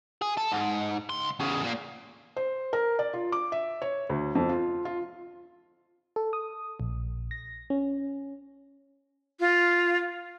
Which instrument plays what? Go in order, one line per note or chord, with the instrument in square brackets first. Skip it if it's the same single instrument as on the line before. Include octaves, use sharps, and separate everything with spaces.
[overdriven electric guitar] G#4
A4
G#2
C#2 C6
E2 C#3
A#2 A#3
[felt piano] C5
A#4
D5
F4
D6
E5
C#5
D2
F2
F4
F4
[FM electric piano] A4
D#6
A#1
A#6
C#4
[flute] F4